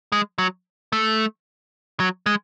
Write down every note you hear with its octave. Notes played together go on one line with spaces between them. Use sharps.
G#3
F#3
A3
F#3
G#3